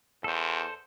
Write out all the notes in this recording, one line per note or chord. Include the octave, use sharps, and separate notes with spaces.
E2 A4 C5